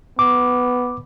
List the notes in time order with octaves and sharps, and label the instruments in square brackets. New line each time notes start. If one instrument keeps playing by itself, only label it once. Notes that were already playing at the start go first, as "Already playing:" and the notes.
[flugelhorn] B3 [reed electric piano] D6